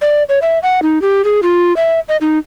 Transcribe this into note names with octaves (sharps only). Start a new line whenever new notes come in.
D5
C#5
E5
F#5
D#4
G4
G#4
F4
E5
D#5
D#4